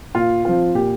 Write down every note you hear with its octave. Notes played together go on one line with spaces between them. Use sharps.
A#2 F4
F3 C4 F4
A#2 G4